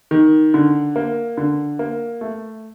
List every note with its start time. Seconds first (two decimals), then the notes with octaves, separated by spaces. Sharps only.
0.11 D#3
0.54 D3
0.96 A#3
1.37 D3
1.79 A#3
2.21 A3